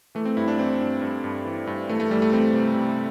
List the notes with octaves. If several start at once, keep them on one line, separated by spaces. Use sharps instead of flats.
E3 A3
C4
G2 E4
D4
E3 C4
G2
G2
G2
E3
G2
E3 A3
A3
E3 G3
A3
E3 C4
C3
C3